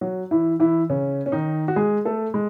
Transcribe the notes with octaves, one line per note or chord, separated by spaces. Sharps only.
F#3 F#4
E3 E4
E3 E4
C#3 C#4
C#4
D#3 D#4
F#4
G#3 G#4
A3 A4
G#3